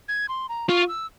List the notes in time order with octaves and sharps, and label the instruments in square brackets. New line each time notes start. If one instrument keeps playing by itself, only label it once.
[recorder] G#6
C6
A#5
[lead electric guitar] F4 [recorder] C#6
[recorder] E6